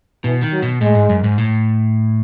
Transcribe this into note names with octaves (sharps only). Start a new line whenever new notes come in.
B2 E3
D#3
F#3
B2
A2 G#3
G#2
F#2
G#2
A2